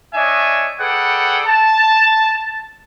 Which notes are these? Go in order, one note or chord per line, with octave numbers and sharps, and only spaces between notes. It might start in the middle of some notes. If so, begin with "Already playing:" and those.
D4 C#5 D#5 E5 G#5
G#4 A4 B4 D5 F#5 G5
A5